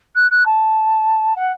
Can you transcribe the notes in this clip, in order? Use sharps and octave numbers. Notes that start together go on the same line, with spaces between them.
F#6
F#6
A5
F#5